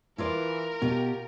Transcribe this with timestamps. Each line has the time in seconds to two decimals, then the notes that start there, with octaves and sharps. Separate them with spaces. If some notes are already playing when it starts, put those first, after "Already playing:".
0.18 E3 E4 F4 A#4 D5
0.82 B2 F4 G4